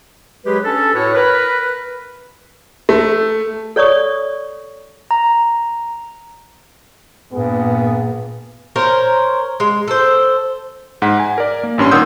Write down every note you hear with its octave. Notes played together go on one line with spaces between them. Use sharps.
F#3 G#3 G4 G#4 B4
C#4 D4 A4
A2 F#4 B4 C#5
A#4 B4
A3
A4 C#5 D5 C#6 D#6
A#5
G2 A#2 B3 G#4
A#4 C5 C#5
G#3
A4 C5
G#2 F#5 B6
G#5
A#4 D5
A#3
A1 G2 C#4 C6
A#2 D#3 F#5 D#6 E6 G6